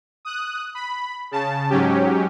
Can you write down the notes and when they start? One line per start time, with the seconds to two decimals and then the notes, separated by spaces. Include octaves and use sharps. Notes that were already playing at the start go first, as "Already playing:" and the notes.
0.25 D#6 F#6
0.75 B5
1.31 C#3 A5
1.70 G#2 F#3 C#4 G4